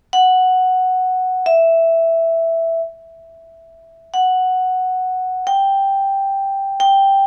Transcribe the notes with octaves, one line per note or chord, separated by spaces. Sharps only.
F#5
E5
F#5
G5
G5